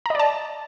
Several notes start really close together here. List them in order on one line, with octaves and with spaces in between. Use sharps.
A#5 D#5 D5 A5